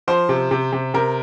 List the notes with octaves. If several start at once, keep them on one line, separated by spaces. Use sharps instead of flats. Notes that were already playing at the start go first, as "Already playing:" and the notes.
F3 C5
C3
C3
C3
C3 A#4